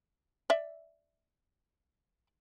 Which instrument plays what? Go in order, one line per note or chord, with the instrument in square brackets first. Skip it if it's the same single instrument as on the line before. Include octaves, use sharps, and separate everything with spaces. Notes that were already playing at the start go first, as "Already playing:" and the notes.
[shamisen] D5 E5